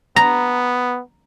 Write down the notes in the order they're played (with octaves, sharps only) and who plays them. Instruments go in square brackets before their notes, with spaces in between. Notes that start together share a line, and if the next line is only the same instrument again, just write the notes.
[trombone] B3 [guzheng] A#5